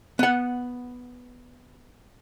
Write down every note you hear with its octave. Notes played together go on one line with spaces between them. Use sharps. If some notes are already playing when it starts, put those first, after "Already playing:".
B3 F#5